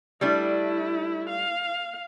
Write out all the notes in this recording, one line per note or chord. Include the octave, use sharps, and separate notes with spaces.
G3 A3 D4 E4
F5